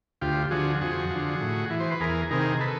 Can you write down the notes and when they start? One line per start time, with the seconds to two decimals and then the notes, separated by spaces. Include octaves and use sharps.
0.21 D2 F4 G4
0.51 D3 F3 F#4 G#4
0.81 F2 F#4 G#4
1.10 D3 F3
1.41 A2
1.70 E3
1.80 C5
1.91 B4
2.00 E2 G#4 A#4
2.31 C3 D#3 G#4 A#4
2.60 A4 B4